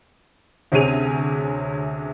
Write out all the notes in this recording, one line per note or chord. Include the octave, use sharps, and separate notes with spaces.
D2 C3 C#4 G#4 D#7 F7